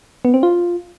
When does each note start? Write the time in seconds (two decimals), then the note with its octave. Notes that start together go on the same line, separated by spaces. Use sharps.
0.25 B3
0.34 C4
0.43 F4